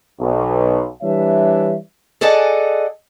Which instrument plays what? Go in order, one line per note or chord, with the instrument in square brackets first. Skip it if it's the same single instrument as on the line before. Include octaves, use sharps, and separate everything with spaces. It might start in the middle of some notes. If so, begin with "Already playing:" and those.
[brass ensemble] B1
E3 G3 D4 G4 C#5 E5
[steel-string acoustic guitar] G#4 A4 D5 D#5 F#5 A5